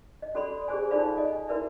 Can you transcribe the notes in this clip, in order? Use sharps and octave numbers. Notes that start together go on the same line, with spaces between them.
D#5
C#4 F#4 A4 D5 B5 C6
G4 G#4 C5 D5 G#5
D#4 F4 A4 D5 F5 B5
D#5 G#5
E4 F#4 A#4 B4 D5 E5